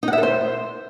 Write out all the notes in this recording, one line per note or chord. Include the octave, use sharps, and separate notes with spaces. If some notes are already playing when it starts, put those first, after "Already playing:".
D#4
F#5
E5
A4
C5